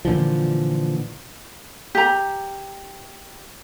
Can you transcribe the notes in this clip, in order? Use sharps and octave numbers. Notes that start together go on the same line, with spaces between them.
A#2 D3 E3 F3
G4 A#5